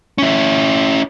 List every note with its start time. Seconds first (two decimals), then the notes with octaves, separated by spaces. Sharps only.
0.18 C#4 E4